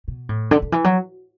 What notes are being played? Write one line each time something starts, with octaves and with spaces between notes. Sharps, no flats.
B2
A2
D3
D3
E3
F#3